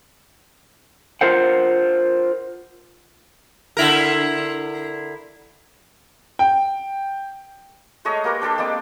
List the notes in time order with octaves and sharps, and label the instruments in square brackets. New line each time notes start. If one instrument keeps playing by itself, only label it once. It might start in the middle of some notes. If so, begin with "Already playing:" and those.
[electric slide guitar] F4 A#4 C5 F#5
[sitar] D3 E4 A#4
[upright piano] G5
[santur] G#3 A3 C#5 D#5
A#3 G4 A#4 B4
D4 G4 A4 C5
G#3 A#3 C4 D5